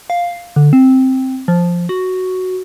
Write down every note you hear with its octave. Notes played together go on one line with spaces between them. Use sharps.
F5
D3
C4
F3
F#4